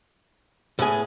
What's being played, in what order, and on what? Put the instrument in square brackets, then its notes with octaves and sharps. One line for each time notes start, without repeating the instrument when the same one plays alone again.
[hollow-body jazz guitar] A2 G#4 [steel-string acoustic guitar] B3 G#5